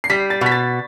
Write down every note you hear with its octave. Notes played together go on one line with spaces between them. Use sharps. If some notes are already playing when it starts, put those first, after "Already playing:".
C7
G3 B6
A6
B2 B6
A6